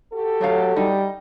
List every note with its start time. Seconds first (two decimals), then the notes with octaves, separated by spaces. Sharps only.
0.13 F#4 G4 A4
0.41 B2 F#3 A3 F5
0.76 G3 D#4